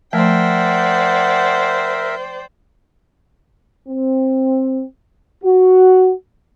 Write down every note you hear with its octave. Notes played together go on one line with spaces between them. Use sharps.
F3 A3 A#4 C5 D5 E5 F#5 G5
C4
F#4